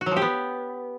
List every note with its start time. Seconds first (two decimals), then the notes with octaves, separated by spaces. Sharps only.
0.01 F#4
0.06 F#3
0.11 F3
0.17 G4
0.22 B3